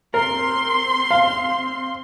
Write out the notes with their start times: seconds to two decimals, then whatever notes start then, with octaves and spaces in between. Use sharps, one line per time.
0.14 C4 A#4 C6
1.11 F5